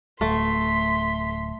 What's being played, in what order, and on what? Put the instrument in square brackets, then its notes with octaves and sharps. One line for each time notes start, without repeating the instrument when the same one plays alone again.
[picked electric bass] D1 [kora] A3 [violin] C6 B6